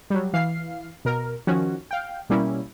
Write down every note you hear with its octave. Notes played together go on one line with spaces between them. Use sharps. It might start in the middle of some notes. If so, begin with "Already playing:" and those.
F#3 G3
E3 F5 C7
B2 A#4
D#3 F3 C#4 F#4
F5 G5
B2 G3 A#3 C#4 E4